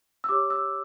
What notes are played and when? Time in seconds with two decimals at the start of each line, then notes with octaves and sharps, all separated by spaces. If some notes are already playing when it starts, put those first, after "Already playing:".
0.24 E6
0.29 G4 C#5 D6
0.50 E6